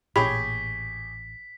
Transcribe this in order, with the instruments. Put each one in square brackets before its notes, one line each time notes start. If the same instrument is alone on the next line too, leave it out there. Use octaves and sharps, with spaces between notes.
[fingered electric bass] A1 A#2 A#3 [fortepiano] G4 G#4 C#5 [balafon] B5 [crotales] B6